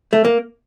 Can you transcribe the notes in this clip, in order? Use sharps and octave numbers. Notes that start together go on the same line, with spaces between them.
A3
A#3